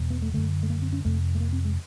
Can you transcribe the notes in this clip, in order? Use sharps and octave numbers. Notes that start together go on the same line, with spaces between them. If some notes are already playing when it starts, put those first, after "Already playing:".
Already playing: E2 B2
B3
A3
F#2 D3 A3
A3
A#3
C4
C#4
F2 C3 A3
A3
A#3
C4
G#3